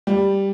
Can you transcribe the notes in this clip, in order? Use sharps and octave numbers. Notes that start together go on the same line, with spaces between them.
G3